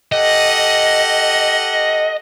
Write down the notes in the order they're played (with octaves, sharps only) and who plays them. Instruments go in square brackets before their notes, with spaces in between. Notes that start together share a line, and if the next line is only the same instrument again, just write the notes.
[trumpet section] G4 A4 F#5 [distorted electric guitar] D#5